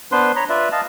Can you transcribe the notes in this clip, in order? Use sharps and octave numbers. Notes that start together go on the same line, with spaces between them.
B3 D4 B4 C5 C6
C#5 A#5 B5
F4 B4 D5 E5
D#5 F5 A5